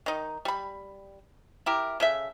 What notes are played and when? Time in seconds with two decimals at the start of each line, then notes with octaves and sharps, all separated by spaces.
0.06 D#3 D#4
0.45 G3 B5
1.66 E4 G4 A#4
2.00 C#3 A4 E5